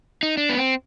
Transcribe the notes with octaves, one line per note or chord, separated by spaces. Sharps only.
D#4
D4
B3
C4